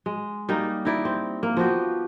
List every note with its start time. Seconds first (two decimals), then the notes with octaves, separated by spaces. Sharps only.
0.06 G#3
0.49 G3 A#3 D#4
0.85 D#4 E4 D5
1.05 C4
1.43 A#3
1.57 F3 B3 F#4 G4